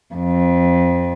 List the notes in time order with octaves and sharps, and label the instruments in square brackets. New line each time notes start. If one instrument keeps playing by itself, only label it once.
[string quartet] F2